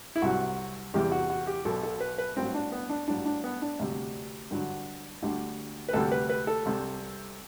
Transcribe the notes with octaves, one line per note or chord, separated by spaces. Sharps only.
E4
C2 C3 F#3 F#4
E2 C3 E3 G3 G4
F#4
F#4
G4
B1 B2 F#3 A4
A4
B4
B4
A1 G2 F#3 C4
D4
B3
D4
A1 G2 F#3 D4
D4
B3
D4
D2 C3 G3
G2 D3 F#3
D2 D3 G3
B4
D2 C3 G3 A4
B4
B4
A4
C2 C3 G3